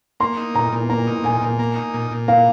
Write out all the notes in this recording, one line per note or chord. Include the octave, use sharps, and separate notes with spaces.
A#3 C6
D#4
A#2 A#5
A#2
A#3 A#5
D#4
A#2 G#5
A#2
A#3
D#4
A#2
A#2
A#3 F5